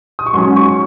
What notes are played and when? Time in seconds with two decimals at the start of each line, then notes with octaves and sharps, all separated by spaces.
0.19 D#6
0.26 C#6
0.34 G#2 F#3 C#4 C6
0.56 C#6